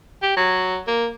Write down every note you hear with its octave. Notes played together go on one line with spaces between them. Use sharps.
G4
F#3
A#3